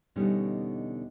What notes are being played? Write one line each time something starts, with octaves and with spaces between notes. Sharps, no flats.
E2 B2 D3 G3 C#4 D#4